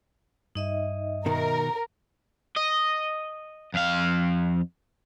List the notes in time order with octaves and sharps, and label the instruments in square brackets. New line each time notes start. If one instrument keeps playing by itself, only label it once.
[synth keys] G2 [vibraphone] D#4 D#5 E5
[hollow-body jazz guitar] B2 D#3 [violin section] A#4
[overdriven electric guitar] D#5
F2 F5